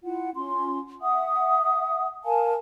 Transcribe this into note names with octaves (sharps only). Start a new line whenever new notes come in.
E4 F4 F#5
C#4 F4 C6
E5 F#5 D#6
A#4 F5 G#5 A5